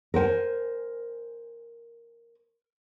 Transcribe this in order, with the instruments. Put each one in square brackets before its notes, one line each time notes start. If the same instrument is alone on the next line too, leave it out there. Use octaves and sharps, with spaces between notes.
[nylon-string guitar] A#4 C5 G5 G#5